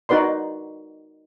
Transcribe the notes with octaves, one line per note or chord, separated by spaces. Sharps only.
D#4 F#4 B4 D5 C6